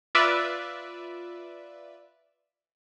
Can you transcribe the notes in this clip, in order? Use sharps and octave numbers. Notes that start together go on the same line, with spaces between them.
F4 B4 D5 E5